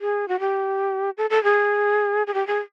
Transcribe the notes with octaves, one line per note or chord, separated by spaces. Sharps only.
G#4
F#4
G4
A4
A4
G#4
G#4
G4
G#4